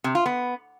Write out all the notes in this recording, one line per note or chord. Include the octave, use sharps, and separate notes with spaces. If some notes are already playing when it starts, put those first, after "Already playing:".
C3
F4
B3